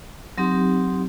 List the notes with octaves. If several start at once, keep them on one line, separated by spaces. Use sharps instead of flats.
F#3 C4 D#4 G4